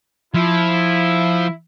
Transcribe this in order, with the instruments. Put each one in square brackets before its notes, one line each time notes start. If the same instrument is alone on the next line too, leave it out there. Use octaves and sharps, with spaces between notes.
[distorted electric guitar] F3 [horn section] E4